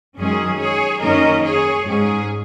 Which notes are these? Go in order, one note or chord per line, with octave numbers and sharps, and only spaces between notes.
F#2 D#3 G#3 C#4 G#4
G#4 C#5
F#2 D#3 A#3 C#4 A#4 D#5
G#4 C#5
G#2 G#3 C#4 G#4